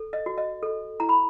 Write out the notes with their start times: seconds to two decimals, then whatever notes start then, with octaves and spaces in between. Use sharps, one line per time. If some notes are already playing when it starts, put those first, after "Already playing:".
Already playing: A4
0.13 D#5
0.26 F#4
0.38 D#5
0.63 A4
1.00 E4 A#5
1.09 B5